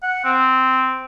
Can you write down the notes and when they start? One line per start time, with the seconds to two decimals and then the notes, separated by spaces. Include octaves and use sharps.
0.03 F#5
0.24 C4